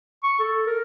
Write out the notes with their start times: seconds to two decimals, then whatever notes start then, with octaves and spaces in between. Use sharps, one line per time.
0.24 C#6
0.40 A4
0.67 A#4